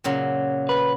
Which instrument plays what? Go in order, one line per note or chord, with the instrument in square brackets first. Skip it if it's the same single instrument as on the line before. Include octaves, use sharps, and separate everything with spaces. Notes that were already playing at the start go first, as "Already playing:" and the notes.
[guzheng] A#2 C#3 F#3
[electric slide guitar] B4